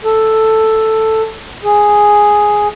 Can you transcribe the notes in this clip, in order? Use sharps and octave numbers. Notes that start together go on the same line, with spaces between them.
A4
G#4